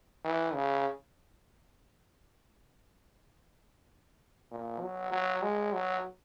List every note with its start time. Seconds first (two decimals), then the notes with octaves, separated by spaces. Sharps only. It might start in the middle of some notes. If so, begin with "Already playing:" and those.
0.24 E3
0.54 C#3
4.51 A#2
4.81 F#3
5.12 F#3
5.43 G#3
5.73 F#3